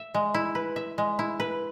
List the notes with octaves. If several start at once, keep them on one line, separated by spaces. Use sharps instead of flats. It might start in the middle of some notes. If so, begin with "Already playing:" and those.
Already playing: E5
G#3
E4
B4
E5
G#3
E4
B4